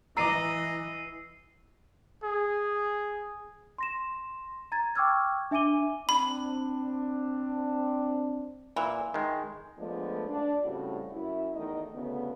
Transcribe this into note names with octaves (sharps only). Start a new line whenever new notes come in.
E3 D#5 A#5 D6 E6 C7 D#7
G#4
C6 A#6 E7
A#5 G#6 A6
G5 C#6 D6 E6 F6 G#6
D4 E5 G#5 D6 D#7 G7
C4 D4 B5
A#2 E3
D#3 G#3
F3 G#3 A3 B3 D4
D4
A2 C#3 G3 C4 F#4
F#2 E4
E2 D#3 A3 D#5
D2 C#3 B3